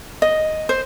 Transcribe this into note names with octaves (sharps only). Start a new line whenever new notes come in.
D#5
C5